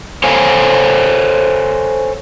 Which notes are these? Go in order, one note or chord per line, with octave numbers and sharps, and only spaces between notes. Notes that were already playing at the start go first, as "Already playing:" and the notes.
A4 C5 C#5 F5 G#5